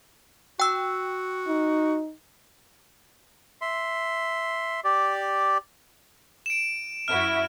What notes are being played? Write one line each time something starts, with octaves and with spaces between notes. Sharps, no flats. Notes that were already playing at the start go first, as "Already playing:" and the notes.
F#4 G5 E6
D#4
E5 C6
G4 D5
D7 E7
F#2 E4 F#4 F6